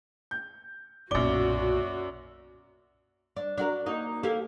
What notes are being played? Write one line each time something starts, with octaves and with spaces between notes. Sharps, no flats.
G6
B1 F#2 A#2 F#4 D5 G7
D4
D4 F#4 A#4
A#3 D#4 F#4
A#3 G4 A4